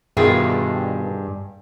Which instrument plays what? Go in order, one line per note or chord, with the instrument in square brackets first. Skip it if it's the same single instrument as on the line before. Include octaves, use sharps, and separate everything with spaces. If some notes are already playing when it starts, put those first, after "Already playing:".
[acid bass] G2 [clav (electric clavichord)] B2 D#3 F4 [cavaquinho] G4 G#4 E5